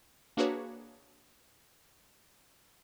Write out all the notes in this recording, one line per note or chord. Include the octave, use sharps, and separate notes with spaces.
A#3 D4 F#4 G#4 B4 C#5